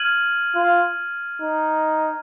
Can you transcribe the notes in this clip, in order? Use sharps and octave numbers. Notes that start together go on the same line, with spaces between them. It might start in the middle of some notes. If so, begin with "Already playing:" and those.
Already playing: F6 G#6 D#7 F#7
F4
D#4